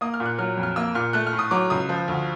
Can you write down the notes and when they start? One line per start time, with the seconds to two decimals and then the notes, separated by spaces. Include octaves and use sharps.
0.01 A#3 D#6
0.14 F6
0.20 A#2
0.26 F#6
0.38 F#3 F6
0.57 F2
0.63 F6
0.76 A#3 E6
0.95 A#2 F6
1.13 A3 F#6
1.27 F6
1.33 A2
1.39 D#6
1.51 F#3 D6
1.70 C#2 D#6
1.89 F3
2.08 D2